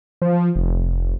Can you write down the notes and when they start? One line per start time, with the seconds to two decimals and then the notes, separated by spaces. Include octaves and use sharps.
0.22 F3
0.56 F1